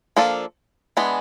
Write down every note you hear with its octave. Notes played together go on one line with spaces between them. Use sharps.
F3 A#3 D4 F4 A4
E3 G#3 B3 D4